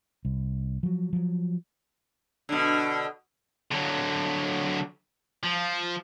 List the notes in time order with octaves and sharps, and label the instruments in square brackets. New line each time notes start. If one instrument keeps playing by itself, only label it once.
[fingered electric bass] C2
F3 F#3
F3 F#3
[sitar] B2 D3
[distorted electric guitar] D3 F#3
F3